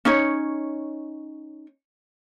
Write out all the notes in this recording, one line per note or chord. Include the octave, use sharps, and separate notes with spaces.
C#4 D#4 C#5